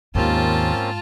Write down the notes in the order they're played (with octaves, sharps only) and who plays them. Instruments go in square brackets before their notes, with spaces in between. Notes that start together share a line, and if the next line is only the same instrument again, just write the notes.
[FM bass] D#2 [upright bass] G#2 [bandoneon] A#3 C4 C#4 [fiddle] F4 A5